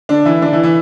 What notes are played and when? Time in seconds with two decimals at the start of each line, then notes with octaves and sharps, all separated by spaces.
0.09 D3 D4
0.25 E3 E4
0.42 D3 D4
0.52 E3 E4
0.63 E3 E4